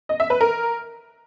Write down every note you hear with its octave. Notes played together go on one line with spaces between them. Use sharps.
D#5
E5
B4
A#4